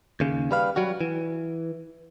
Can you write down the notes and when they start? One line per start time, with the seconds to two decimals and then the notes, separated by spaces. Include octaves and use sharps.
0.20 D#2 C#3
0.51 G3 B4 F5
0.76 F#3 G3 F#4
1.01 E3